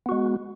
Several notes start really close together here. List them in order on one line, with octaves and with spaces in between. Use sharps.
B3 F#4 G#3